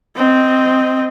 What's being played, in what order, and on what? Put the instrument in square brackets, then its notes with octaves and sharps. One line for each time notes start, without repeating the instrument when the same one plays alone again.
[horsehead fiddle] C4 D#5